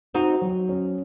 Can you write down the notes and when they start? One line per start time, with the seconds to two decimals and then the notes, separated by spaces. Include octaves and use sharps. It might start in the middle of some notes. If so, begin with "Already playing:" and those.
0.14 C4 D#4 F#4
0.42 F#3
0.69 C#4